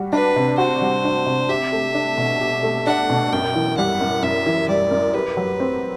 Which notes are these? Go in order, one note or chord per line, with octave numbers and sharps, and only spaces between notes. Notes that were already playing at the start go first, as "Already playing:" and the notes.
Already playing: G3 F#4
D4 B4
C3
F#4 C5
G3
D4
C3
G4 E5
A3
D4
B2
G4
A3
D4 F#5
B2
F#2 G5
E3
G3 F#5
F#2
F#2 E5
E3
G3 D5
F#2
G4 B4
F#3
C4